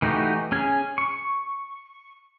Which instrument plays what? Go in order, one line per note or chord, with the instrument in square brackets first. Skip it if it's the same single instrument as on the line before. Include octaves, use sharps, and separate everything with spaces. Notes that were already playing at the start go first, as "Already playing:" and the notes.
[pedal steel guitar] E3 A3 D#4 F#4 G4
C#4 G#4 G#5
C#6